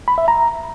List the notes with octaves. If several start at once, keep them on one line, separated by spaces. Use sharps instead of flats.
B5
E5
A#5